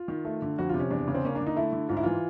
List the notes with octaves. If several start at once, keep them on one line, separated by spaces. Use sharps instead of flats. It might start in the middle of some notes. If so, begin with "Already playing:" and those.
Already playing: F4
D#3
A3
D3
F2 F#4
C3 F4
C#4
E2 D4
C#3
C4
A#3 C#4
D4
D3
D#4
A3 E4
D3
G#2 F4
E4
E3 F4